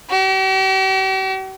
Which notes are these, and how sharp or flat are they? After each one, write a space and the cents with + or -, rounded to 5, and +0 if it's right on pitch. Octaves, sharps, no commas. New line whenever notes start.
G4 -45